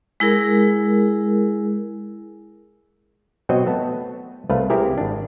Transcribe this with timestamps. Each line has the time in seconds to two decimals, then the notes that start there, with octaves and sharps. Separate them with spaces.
0.20 G#3 E4 G#4 A#4
3.49 B2 F#3 C4 F#4 D#5
3.66 A3 B3 A5
4.49 C2 A3 B4 F5
4.70 C4 E4 G4 G#4 A#4
4.98 G#1 D4